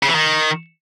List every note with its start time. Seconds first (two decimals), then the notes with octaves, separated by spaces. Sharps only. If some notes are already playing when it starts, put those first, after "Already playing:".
0.03 C#3
0.09 E3
0.15 D#3